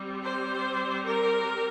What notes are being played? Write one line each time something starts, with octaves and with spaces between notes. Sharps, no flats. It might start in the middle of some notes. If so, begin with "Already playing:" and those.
Already playing: G3 C4
C5
A#4